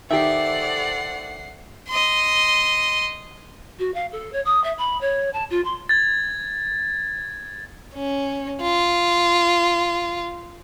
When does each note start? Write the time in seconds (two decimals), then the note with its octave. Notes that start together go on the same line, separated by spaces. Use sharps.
0.11 D#3 G4 A4 C5 D5 E5 F#5 C7
1.89 D#5 C6
3.79 F#4
3.94 F5
4.12 A4
4.33 C#5
4.45 D#6
4.64 E5
4.78 B5
5.01 C#5
5.33 A5
5.50 F4
5.64 C6
5.89 G#6 A6
7.94 C#4
8.61 F4